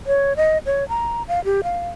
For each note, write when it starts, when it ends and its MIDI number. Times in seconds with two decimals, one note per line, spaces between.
0.07 0.33 73
0.37 0.58 75
0.66 0.87 73
0.89 1.23 82
1.28 1.43 77
1.45 1.61 67
1.64 1.89 77